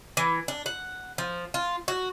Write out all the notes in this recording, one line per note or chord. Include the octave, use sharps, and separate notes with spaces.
E3
D4
F#5
F3
F4
F#4